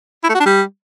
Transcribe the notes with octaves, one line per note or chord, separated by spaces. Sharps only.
E4
A3
F#4
D4
G3